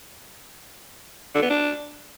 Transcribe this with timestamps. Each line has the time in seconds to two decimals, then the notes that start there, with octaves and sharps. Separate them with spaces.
1.35 D3
1.42 B3
1.50 D4